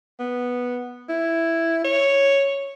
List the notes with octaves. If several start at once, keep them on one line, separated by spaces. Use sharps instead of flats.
B3
E4
C#5